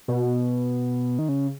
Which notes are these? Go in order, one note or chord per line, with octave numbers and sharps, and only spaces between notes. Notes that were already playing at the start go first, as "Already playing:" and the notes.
B2
D#3
C#3